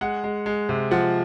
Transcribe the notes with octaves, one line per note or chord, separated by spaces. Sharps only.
G#3 F#5
G#3
G#3
C3
F3 F#5